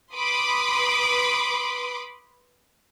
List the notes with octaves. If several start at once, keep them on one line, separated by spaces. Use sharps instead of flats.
B4 B5 C6 D6 D#6